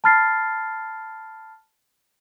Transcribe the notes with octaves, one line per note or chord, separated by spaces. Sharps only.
A5 B5 F6 A6 C7